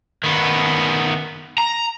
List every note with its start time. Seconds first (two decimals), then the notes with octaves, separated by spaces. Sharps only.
0.24 D#3 B3
1.58 A#5